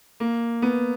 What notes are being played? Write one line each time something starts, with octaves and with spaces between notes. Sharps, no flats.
A#3
B3